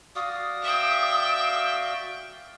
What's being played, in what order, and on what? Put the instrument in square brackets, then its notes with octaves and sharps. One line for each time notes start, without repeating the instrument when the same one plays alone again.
[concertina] F#4 D5 F5 [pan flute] D#6
[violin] E5 G5